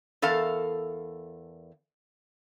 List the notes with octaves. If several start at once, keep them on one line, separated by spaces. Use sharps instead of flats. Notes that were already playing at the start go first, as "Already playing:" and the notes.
E2 A4 A#4 F5